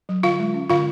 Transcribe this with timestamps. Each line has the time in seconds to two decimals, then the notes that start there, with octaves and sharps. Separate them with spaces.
0.09 F#3
0.23 D3 F4 F5
0.40 G#3
0.54 C#4
0.70 D3 F4 F5